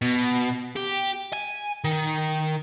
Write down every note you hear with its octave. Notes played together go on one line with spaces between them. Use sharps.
B2
G4
G#5
D#3